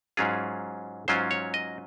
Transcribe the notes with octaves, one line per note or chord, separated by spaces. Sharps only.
G#2 F#3 C#4 F4 G#4
G#2 F#3 C#4 F4 C5
C#5
D#5